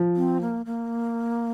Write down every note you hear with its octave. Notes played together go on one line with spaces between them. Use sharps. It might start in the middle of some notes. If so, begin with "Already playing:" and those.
Already playing: F3
C4
A#3
A#3